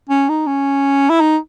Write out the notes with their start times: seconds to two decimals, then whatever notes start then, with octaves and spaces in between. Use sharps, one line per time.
0.09 C#4
0.29 D#4
0.47 C#4
1.10 E4
1.21 D#4